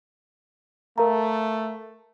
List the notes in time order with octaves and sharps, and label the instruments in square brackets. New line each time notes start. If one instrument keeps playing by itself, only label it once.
[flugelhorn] A3 [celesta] A#4 F5 A#5